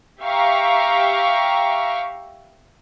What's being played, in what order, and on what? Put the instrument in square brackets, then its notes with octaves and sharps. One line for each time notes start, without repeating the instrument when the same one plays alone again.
[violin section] G4 E5 F5 G5 A#5 C#6